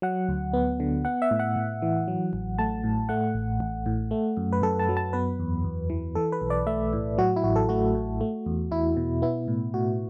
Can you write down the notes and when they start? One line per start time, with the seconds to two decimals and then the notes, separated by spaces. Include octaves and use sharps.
0.02 F#3 F#5
0.28 D2
0.53 B3
0.80 D3
1.05 B3 F#5
1.22 E5
1.31 A2
1.39 F#5
1.56 A2
1.82 E3
2.08 F#3
2.33 A1
2.59 A3 A5
2.84 A2
3.09 A3 F#5
3.34 A1
3.60 A1
3.86 A2
4.11 A3
4.37 F#2
4.53 B4
4.62 F#2 A4
4.79 A5
4.89 F#3
4.97 A5
5.13 B3 B4
5.39 E2
5.64 E2
5.90 E3
6.15 E3 A4
6.32 B4
6.41 B1
6.50 D5
6.67 A3 E5
6.93 A2
7.18 F#3 F#4
7.36 E4
7.43 A1 F#4
7.56 A4
7.69 A3 F#4
7.95 A2
8.21 A3
8.46 E2
8.71 E2 E4
8.97 B2
9.22 B3 E4
9.48 A2
9.74 A2 F#4